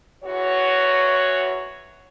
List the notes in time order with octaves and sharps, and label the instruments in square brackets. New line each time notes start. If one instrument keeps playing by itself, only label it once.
[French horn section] E2 F#4 C#5